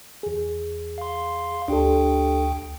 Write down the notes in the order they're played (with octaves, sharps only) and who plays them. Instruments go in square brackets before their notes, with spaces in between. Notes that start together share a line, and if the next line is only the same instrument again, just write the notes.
[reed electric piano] E2 G#4
[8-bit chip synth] F5 C6
[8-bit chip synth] D2 G5 [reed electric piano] D4 G4 A4